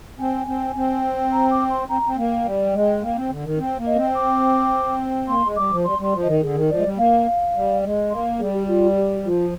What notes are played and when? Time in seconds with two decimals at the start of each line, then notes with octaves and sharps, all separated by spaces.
0.19 C4 G#5
0.47 C4
0.75 C4
1.32 A#5
1.51 D6
1.70 C6
1.88 C4 A#5
2.06 C4
2.17 A#3 G5
2.45 G3
2.73 G#3
3.02 A#3
3.16 C4
3.30 D3
3.44 D#3
3.58 C4
3.78 A#3
3.86 D#5
3.96 C4
4.14 D6
5.28 A#3 C6
5.42 G#3
5.56 G3 D6
5.71 F3
5.84 G3 C6
5.99 G3 C6
6.13 F3
6.22 D#3 D#5
6.41 D3 G#4
6.55 D#3
6.69 F3 D5
6.77 G#3
6.83 G3
6.97 A#3 F5
7.55 G3
7.83 G#3
8.10 A#3 C6
8.39 G3 G#4
8.53 G4
8.67 F4
8.96 G4
9.24 F3 F4